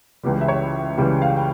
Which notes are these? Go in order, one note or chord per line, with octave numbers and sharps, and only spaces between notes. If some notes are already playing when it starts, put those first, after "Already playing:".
C#2 C#3 E3 G3 G4
E5
C#5
C#2 C#3 E3 G3 G5
F5
G5